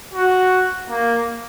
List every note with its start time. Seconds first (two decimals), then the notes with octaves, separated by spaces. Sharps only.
0.14 F#4
0.89 A#3